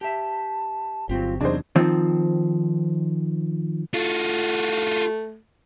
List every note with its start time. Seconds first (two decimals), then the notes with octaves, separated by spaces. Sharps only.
0.01 G4 E5 A5
1.09 G1 F#3 C4 F4 G4
1.41 E2 C3 F#3 D4 D#4 G#4 C5
1.76 D#3 F3 C4
3.93 A3 F4 F#4